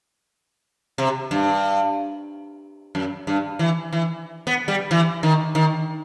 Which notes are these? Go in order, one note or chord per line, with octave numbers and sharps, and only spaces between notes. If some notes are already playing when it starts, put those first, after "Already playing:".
C3
G2
F#2
G2
E3
E3
B3
G3
E3
D#3
D#3